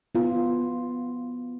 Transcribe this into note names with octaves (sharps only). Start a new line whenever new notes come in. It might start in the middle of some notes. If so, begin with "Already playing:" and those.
B3 F4